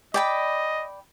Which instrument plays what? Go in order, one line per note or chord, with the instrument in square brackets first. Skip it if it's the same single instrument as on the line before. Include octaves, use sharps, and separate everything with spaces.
[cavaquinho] D5 G5 B5 [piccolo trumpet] D#5